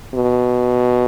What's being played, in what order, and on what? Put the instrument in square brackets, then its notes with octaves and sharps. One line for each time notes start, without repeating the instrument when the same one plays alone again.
[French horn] B2